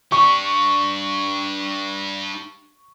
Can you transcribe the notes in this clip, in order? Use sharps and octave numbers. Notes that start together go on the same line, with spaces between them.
D4 G4 C#6